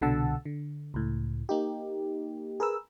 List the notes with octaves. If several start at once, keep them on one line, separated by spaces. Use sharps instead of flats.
C2 B2 D3 F#5 A5 E6
D3
C#2 A2
A#3 D#4 G4
G#4 A#4 B4 E6